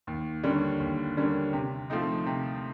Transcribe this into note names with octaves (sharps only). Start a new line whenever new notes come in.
D#2
D3 G3 A#3 C#4
D#2
D3 G3 A#3 C#4
C3
F3 A3 C4 D#4
C3